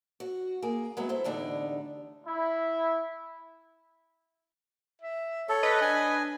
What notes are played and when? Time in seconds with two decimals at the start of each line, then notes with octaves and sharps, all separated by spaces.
0.20 F#4
0.62 A#3 G#4
0.97 F#3 G#3 B3 E4
1.09 E4 A4 C5 E5
1.24 E2 A2 D3 D4 D#4 G4
2.27 E4
5.02 E5
5.49 A4 C#5
5.63 B4 D#5
5.82 D4 G#5